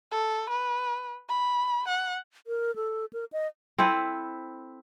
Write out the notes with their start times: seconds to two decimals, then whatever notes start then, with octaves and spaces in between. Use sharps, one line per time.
0.12 A4
0.50 B4
1.29 B5
1.88 F#5
2.47 A#4
2.76 A4
3.13 A#4
3.33 D#5
3.78 C4 E4 A4 B4